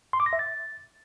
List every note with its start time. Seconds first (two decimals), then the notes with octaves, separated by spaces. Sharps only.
0.13 C6
0.20 D6
0.26 A#6
0.33 E5
0.39 A6